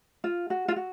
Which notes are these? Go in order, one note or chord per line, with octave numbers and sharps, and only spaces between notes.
F4
F#4
F4
F#4